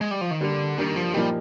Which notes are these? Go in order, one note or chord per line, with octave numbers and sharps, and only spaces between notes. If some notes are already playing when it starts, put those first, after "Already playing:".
G#3
G3
F3
D#3
D3 G3 A#3 D4
D#3 G3 A#3 D4
F3
A#2 F3 G3 A#3 D#4 G4